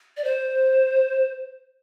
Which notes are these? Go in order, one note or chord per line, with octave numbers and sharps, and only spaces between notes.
D5
C5